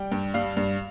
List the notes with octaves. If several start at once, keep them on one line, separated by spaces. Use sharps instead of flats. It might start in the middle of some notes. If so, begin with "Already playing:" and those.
Already playing: G3 G5
G2
G3 F5
G2